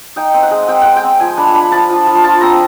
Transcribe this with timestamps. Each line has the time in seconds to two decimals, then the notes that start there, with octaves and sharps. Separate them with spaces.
0.16 D#4 G5
0.34 C4
0.43 F#5
0.51 G#3
0.68 C4 G5
0.82 G#3 F#5
0.96 G5
1.04 C4
1.20 F3 G#5
1.37 D4 B5
1.54 D4 B5
1.72 F3 A5
1.89 F3
2.07 F3
2.24 F4 A5
2.41 C4 A#5